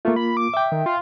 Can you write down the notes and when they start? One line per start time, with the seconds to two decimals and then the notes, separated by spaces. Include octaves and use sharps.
0.05 A3 A#3 F4
0.16 B5
0.37 D6
0.54 E5 G5
0.72 D#3
0.86 F4